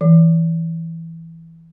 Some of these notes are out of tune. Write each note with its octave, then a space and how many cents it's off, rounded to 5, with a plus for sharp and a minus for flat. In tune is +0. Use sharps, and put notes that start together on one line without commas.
E3 +0